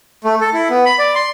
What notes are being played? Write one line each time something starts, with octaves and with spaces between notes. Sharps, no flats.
A3
A4
E4
B3
B5
D5
C6